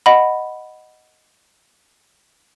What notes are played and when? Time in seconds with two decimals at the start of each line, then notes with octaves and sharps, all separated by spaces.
0.06 D#5 F#5 B5